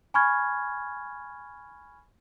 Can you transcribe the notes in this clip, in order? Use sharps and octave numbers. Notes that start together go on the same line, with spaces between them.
G#5 B5 C#6 F6 G#6